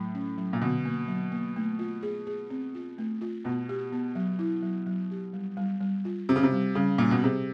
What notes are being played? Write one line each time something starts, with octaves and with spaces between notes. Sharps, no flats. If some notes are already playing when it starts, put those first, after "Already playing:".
Already playing: A2 F#3
C#4
F#3
A#2
B2 D3
A#3
F#3
A#3
A3
F4
G#4
G#4
C4
F4
A3
F4
B2 B3
G4
B3
F#3
E4
F#3
F#3
G4
G3
G3
G3
F4
C3 C4
C#3
C3
G3
C#3 G3
A#2 G3
B2
C3 G#4